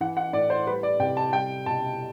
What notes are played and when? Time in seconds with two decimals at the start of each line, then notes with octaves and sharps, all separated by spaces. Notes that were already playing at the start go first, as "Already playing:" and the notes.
0.01 E3 F#5
0.17 F#5
0.33 A2 D5
0.50 C5
0.66 G3 B4
0.83 D5
1.00 C3 G5
1.17 A5
1.32 G3 G5
1.66 B2 A5